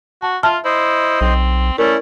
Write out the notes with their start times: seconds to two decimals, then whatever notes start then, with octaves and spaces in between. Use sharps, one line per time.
0.22 F#4 A5
0.43 F4 E5 A5 F6
0.65 E4 C5 D#5
1.21 B1 C4
1.78 A3 C#4 E4 A#4 D5